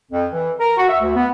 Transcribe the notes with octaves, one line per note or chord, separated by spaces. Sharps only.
F2
E3
A#4
F#4
E5
D2
B3